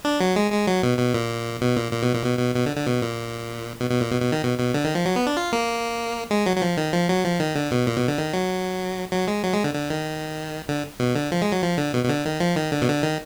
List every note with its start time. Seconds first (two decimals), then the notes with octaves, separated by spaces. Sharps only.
0.05 D4
0.20 F#3
0.36 G#3
0.52 G#3
0.67 F#3
0.83 B2
0.99 B2
1.14 A#2
1.61 B2
1.77 A#2
1.93 A#2
2.03 B2
2.13 A#2
2.24 B2
2.39 B2
2.55 B2
2.66 D3
2.76 D3
2.86 B2
3.02 A#2
3.80 B2
3.90 B2
4.01 A#2
4.12 B2
4.22 B2
4.32 D#3
4.43 B2
4.58 B2
4.74 D3
4.84 D#3
4.95 F3
5.05 F#3
5.16 B3
5.27 D4
5.37 F4
5.53 A#3
6.31 G#3
6.46 F#3
6.56 F#3
6.62 F3
6.77 D#3
6.93 F3
7.09 F#3
7.25 F3
7.40 D#3
7.55 D3
7.71 B2
7.87 A#2
7.97 B2
8.08 D3
8.18 D#3
8.34 F#3
9.12 F#3
9.28 G#3
9.43 F#3
9.54 G#3
9.64 D3
9.75 D3
9.90 D#3
10.69 D3
11.00 B2
11.15 D3
11.32 F3
11.42 G#3
11.52 F#3
11.63 F3
11.78 D3
11.94 B2
12.05 B2
12.09 D3
12.26 D#3
12.40 F3
12.56 D#3
12.72 D3
12.81 B2
12.88 D3
13.03 D#3